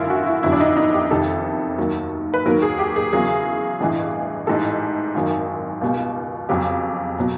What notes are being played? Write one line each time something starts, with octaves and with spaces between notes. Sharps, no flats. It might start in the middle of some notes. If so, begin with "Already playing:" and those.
Already playing: G#1 F#2 D3 F#3 E4 F4
F#4
E4
G1 F2 D3 F#3 E4
D4
D#4
D#4
G4
F2 C3 D#3 G3 A4
D#2 D#3 F#3
B4
D#2 D#3 F#3 A#4
G#4
G4
G#4
E2 C#3 F#3 G#4
A1 G2 E3
A1 G#2 E3 G3 A4
G#1 F#2 D#3 F#3
C#2 B2 G3
F2 C#3 F#3 G4
B2 F#3